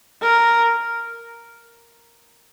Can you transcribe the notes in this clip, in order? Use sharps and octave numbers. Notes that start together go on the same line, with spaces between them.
A#4